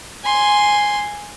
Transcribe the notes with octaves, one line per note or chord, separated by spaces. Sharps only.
G#5 C6